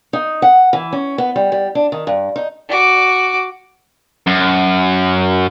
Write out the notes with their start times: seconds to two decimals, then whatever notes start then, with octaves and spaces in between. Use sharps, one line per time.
0.13 D#4
0.42 F#5
0.73 E3
0.93 C#4
1.18 B3
1.36 G3
1.52 G3
1.75 D4
1.92 D#3
2.07 G2
2.36 D#4
2.69 F#4 D6
4.27 F#2